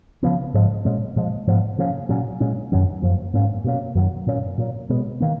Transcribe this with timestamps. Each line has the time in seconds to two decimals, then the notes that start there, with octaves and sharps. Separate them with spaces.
0.23 C#3 F3 B3
0.54 G#2 F3 G#3
0.85 A#2 G#3 C#4
1.16 A#2 F3 G#3
1.47 G#2 F3 B3
1.78 C#3 F3 A#3 C#4
2.09 A#2 F#3 C#4
2.40 A#2 G#3 C#4
2.72 F#2 D#3 F#3 C#4
3.02 F#2 F3 A#3
3.34 G#2 F#3 A#3 C#4
3.64 B2 A#3 C#4
3.95 F#2 D#3 F#3
4.27 A#2 F#3 A#3 C#4
4.58 A#2 F#3 A#3
4.89 B2 G#3 B3
5.20 D#3 A#3